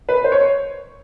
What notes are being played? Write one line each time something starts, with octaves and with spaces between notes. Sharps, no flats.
B4
C5
C#5